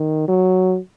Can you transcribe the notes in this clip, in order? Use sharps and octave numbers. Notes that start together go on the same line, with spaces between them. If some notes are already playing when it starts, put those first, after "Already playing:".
Already playing: D#3
F#3